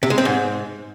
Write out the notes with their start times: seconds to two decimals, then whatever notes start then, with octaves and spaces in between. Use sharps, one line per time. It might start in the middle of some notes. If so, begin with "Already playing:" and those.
0.03 C3
0.10 G#3
0.18 C4
0.25 G#2